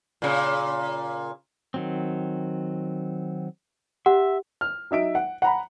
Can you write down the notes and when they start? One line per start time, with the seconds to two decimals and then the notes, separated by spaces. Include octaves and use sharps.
0.22 A#2 C#3
1.74 D#3 F#3 C4
4.06 G4 E5 F#5
4.61 F6
4.91 F#3 D#4 E5 D7
5.15 F#5
5.42 F#5 A#5 B5